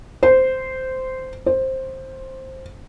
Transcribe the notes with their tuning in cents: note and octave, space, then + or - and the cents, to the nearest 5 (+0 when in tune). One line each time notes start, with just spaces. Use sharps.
C5 -10
C5 +10